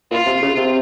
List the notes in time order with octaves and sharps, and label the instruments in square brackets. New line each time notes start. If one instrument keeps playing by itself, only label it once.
[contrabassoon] A#2 [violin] F4
[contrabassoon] C3
C#3
C3